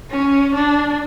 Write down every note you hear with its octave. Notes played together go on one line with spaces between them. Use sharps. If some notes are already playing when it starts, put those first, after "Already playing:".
C#4
D4